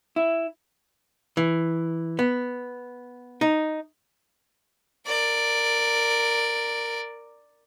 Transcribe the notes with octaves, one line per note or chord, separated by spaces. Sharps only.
E4
E3
B3
D#4
A#4 D5